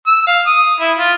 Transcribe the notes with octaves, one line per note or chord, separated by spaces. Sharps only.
E6
F5
D#6
E4
F4